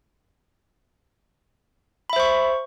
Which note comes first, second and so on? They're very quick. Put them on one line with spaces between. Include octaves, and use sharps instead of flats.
B5 E5 C5 C#6